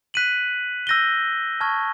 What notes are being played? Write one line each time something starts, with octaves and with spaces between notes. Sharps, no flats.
F#6 B6 D#7 F#7
E6 G6 A#6 D#7 G7
A5 C#6 F6 G#6